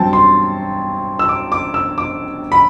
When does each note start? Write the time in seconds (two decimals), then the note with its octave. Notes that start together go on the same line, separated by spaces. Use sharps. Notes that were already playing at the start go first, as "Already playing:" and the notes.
Already playing: G2 F#3 C4 G5 A5
0.13 C6
1.19 E6
1.29 D6
1.52 D6
1.74 E6
1.98 D6
2.52 B5